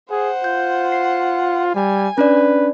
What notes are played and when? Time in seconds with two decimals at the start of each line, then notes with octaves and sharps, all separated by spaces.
0.10 G#4 C5 F#5
0.44 F4 G6
0.92 C7
1.75 G3 G#5
2.18 C#4 D4 B4 D5